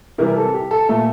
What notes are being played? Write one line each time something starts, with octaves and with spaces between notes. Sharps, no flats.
C3 E3 G3 A#4
A4
G4
A4
A#2 A3 A4